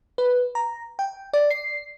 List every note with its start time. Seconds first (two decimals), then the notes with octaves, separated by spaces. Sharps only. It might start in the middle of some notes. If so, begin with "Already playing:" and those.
0.18 B4
0.55 A#5
0.99 G5
1.33 D5
1.51 C7